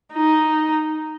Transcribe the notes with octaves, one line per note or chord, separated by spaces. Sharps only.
D#4